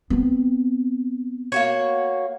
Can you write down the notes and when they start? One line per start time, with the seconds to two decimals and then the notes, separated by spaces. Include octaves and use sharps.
0.10 B3 C4
1.52 A#3 F#4 C#5